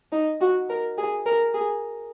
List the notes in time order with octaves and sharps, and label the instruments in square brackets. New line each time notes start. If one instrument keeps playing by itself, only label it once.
[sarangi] D#4
F#4
A#4
G#4
A#4
G#4